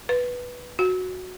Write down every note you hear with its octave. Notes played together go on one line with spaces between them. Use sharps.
B4
F#4